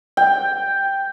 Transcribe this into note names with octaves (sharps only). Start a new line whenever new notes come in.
G5